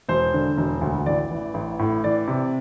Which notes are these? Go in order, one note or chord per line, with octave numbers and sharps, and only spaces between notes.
E1 C5
D3
E1
D2
A1 D5
E3
A1
A2
E3 D5
C3